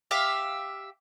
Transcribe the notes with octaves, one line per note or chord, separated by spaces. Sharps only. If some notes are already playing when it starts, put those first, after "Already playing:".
G4 E5 F5